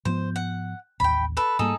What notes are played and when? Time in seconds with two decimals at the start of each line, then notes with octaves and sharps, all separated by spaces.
0.05 G#2 F3 B3 C5
0.36 F#5
1.00 A1 D#2 G5 B5
1.37 A4 B4
1.59 G#2 G3 A#3 D#4 G#4 A4